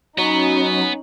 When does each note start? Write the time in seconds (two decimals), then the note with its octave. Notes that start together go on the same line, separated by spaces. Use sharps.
0.18 F#3 B3 C#4 D#4